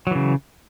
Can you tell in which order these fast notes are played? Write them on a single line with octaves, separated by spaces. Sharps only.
F#3 E3 C#3